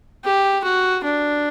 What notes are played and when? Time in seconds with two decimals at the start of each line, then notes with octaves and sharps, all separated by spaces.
0.24 G4
0.64 F#4
1.04 D4